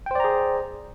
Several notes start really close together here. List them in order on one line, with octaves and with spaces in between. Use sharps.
G5 C5 D5 A#5 G#4